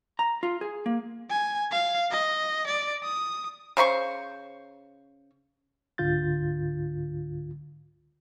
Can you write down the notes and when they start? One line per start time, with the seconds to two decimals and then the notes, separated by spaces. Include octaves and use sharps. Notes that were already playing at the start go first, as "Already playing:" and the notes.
0.19 A#5
0.43 F4
0.61 G#4
0.86 A#3
1.29 G#5
1.71 F5
2.11 D#5
2.67 D5
3.04 D#6
3.77 C#3 C5 B5 C#6
5.98 C#2 G#2 D3 F4 G6 A6